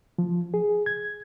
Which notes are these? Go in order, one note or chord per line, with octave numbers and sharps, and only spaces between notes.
F3
G#4
G#6